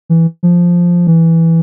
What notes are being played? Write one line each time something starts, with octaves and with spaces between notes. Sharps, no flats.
E3
F3
E3